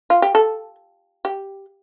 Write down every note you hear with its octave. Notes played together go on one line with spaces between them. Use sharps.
F4
G4
A4
G4